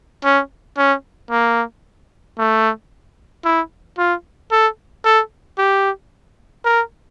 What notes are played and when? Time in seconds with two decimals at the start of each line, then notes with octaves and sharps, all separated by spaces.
0.24 C#4
0.78 C#4
1.31 A#3
2.38 A3
3.45 E4
3.98 F4
4.52 A4
5.05 A4
5.59 G4
6.65 A#4